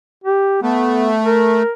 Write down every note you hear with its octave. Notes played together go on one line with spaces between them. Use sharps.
G4
A3 B3
A#4